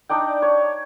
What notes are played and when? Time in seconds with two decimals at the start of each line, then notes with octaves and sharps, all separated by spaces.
0.09 D4 D#4 D5 G5
0.42 C#5